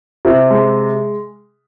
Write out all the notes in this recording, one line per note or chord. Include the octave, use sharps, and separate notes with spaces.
C3
G#3